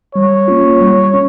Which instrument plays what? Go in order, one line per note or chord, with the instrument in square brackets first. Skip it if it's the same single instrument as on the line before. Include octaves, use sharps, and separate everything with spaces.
[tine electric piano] G3 [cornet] C#5
[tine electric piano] A#3 C#4 F4
G3
C#4